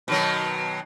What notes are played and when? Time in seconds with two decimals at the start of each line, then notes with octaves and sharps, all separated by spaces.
0.08 B2 D#3 F#3